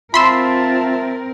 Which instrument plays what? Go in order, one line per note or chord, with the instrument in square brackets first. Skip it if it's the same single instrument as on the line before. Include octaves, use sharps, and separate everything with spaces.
[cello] C4 A#4 [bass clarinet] F4 [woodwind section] E5 A5 [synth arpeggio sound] B5 C6 E6